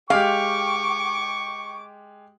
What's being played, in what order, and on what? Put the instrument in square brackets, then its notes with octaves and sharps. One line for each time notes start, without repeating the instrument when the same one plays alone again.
[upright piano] G#3 G4 [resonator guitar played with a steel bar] F5 [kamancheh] G5 D6 [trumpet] C#6